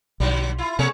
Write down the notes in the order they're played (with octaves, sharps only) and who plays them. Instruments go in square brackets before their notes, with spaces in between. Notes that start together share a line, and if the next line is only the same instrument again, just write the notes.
[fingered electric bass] B1 [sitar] D3 F#3 G3
[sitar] E4 F4
[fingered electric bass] C3 [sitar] A3 G#4 C#5